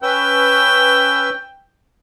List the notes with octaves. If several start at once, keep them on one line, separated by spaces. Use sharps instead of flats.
C#4 B4 G5 E6